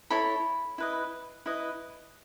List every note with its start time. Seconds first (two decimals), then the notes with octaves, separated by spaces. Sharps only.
0.10 E4 A4 C#5 B5
0.78 E4 B4 D#5
1.46 E4 B4 D#5